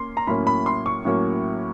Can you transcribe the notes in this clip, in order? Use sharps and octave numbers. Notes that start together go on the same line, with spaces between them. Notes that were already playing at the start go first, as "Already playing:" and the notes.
Already playing: A#3 C#4 C6
A#5
A2 F#3 A#3 C#4 B5
B5
C6
C#6
A2 F#3 A#3 C#4